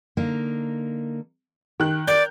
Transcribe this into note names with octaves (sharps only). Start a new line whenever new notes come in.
D3 A#3 D#4
D#3 G4 F#6
A#4 D5 G6